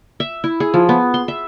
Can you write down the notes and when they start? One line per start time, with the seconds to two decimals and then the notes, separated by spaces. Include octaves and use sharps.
0.20 E5
0.44 E4
0.60 G#4
0.74 F3
0.89 B3
1.14 C6
1.28 E5